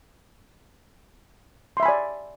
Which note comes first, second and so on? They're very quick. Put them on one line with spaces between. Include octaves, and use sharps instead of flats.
C6 E5 B5 G#5 D5